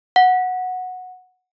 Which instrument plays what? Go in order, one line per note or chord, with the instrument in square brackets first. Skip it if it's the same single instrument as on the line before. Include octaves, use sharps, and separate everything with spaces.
[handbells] F#5